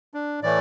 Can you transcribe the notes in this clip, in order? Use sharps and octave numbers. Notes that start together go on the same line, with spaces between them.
D4
A2 E3 A3 D5